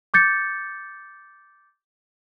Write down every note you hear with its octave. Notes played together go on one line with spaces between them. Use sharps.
D6 G6 A6 C#7